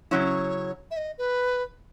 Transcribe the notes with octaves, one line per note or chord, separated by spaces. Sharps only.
C#3 F#3 C#4 E4 C#5
E5
D#5
B4